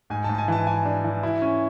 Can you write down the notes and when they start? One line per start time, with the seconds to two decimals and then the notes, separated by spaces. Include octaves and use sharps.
0.10 G#2 G#5
0.24 A5
0.29 G#2
0.35 A5
0.38 G#5
0.48 E3 A5
0.67 E3 G#5
0.85 D4
1.04 E3
1.23 E4
1.42 C#4